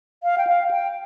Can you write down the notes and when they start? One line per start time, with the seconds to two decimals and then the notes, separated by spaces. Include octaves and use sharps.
0.23 F5
0.38 G5
0.47 F5
0.71 G5